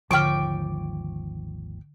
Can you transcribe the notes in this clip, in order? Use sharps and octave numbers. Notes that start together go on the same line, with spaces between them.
G#1 D#2 D3 F3 G5 C#6 D6 F6